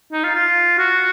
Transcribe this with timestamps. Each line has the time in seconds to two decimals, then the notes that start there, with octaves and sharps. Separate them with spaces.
0.12 D#4
0.24 F4
0.35 F4
0.78 F#4